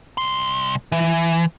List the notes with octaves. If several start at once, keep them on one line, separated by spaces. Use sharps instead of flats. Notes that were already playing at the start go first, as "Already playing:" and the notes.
C2 C6
E3